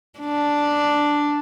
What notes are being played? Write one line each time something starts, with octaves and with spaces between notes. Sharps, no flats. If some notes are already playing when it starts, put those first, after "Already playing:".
D4